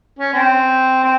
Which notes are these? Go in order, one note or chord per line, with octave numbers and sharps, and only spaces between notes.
C#4
C4
C4